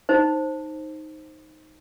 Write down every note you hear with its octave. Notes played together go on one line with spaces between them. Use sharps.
D#4 C5